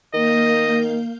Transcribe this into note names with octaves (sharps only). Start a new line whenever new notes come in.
D#3 A#3 D#5 F5 G6